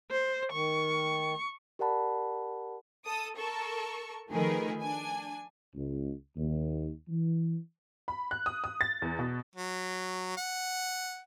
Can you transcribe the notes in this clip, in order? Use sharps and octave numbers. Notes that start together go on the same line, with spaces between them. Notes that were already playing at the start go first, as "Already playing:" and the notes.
C5
D#3 C#6
G4 A#4 D5 F#5 A5 B5
A4 D#6
A4 A#4 C#6
D#3 F3 A3 G#4 A#4 B4
D4 G#5
C#2
D#2
E3
B5
F#6
D#6
D#6
A6
E2
B2
F#3
F#5